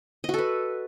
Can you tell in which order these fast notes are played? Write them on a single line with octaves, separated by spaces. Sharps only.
D#5 F#4 A4 B4